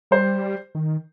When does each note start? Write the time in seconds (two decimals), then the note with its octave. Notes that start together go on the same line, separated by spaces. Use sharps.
0.11 G3 C5
0.75 D#3